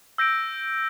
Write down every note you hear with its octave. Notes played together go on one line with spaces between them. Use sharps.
E6 G6 A#6 D7